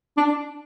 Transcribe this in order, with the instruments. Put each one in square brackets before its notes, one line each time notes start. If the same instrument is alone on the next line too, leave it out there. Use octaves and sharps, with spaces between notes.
[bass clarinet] D4